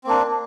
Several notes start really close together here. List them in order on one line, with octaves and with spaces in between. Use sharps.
C4 A#3 D4